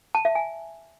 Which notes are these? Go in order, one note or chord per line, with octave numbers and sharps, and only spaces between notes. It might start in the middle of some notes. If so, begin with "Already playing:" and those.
A5
E5
G#5